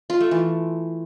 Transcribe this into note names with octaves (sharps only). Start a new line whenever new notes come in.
F4
A3
E3